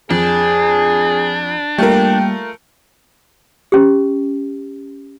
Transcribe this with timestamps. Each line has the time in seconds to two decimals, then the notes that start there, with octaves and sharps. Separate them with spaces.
0.11 F2 D4 G#4
1.78 G3 A3 A#3 F4 A#4 G5
3.72 C#4 G4